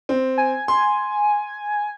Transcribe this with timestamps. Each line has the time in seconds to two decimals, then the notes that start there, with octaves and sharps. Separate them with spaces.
0.09 C4
0.38 G#5
0.68 C6